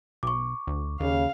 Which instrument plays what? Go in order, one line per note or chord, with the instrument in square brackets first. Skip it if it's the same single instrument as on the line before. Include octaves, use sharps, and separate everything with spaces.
[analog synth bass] B1 [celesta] C#6 D6
[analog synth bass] D2
[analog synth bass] D#2 [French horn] C#3 [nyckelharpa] F5